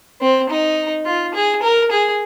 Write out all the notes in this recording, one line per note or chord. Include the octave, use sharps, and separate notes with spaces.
C4
D#4
F4
G#4
A#4
G#4